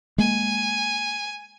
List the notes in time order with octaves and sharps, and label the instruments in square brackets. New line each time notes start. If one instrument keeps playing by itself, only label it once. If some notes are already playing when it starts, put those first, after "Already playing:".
[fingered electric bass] G#3 A#3 [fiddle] G#5